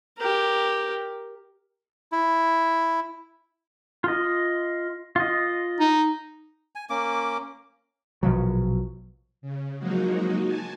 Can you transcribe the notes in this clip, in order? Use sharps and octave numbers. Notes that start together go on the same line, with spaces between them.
G4 A#4
E4
F4 D#5
F4 D#5
D#4
G#5
A#3 C#4 D6
A#1 B2 F3 F#3
C#3
F3 F#3 G#3 A#3 D#4 F#4
G#5 A5